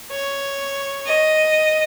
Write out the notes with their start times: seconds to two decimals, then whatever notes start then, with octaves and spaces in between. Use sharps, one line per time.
0.11 C#5
1.07 D#5